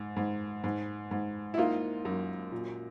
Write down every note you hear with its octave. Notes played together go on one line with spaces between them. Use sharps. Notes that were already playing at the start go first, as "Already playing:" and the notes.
Already playing: G#2
G#2
G#2
G#2
E4
A#3 D#4 F4
F#2
A#2